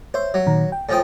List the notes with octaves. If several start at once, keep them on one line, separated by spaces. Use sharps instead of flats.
C5 C#5 E5
F#3
A#2 D#3 A#5
G5
A2 F3 G5 G#5 D#6